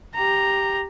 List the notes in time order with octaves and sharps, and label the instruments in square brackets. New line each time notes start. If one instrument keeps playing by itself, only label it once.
[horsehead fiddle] G4 A#5